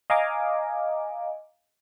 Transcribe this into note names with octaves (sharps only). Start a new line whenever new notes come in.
D#5 F5 G#5 A#5 D6